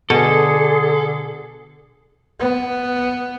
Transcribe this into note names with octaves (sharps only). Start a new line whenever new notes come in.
B2 D3 G#4 A4
B3